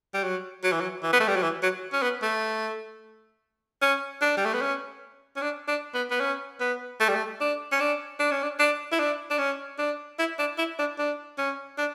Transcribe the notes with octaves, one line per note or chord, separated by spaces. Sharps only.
G3
F#3
F#3
E3
F#3
E3
B3
A3
G3
F#3
E3
F#3
C#4
B3
A3
C#4
D4
G3
A3
B3
C#4
C#4
D4
D4
B3
B3
C#4
B3
A3
G3
A3
D4
C#4
D4
D4
C#4
D4
D4
E4
D4
D4
C#4
D4
E4
D4
E4
D4
D4
C#4
D4